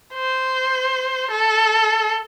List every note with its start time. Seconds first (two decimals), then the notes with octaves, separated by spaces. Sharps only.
0.14 C5
1.31 A4